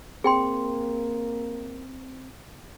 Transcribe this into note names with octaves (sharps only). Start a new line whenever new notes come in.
A#3 C4 G#4 G5 C6